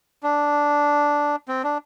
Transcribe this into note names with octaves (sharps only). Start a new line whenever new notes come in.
D4
C4
D4